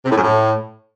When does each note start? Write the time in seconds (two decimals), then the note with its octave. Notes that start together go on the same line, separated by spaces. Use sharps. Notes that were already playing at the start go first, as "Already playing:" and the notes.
0.06 C3
0.11 A2
0.17 F#2
0.23 A2